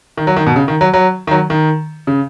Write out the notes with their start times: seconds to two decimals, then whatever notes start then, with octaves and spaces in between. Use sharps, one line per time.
0.17 D#3
0.27 F#3
0.36 D#3
0.46 B2
0.56 C#3
0.68 D#3
0.81 F#3
0.94 F#3
1.27 D#3
1.31 F#3
1.50 D#3
2.07 C#3